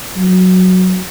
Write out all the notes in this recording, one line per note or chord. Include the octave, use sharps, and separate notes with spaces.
F#3